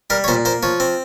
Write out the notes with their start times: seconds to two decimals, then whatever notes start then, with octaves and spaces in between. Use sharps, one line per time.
0.10 G3 A#4
0.24 C#5
0.28 A#2 C5
0.45 A#3 C5
0.63 F3 C#5
0.80 C4